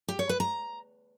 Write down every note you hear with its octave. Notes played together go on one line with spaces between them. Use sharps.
G4
C#5
B4
A#5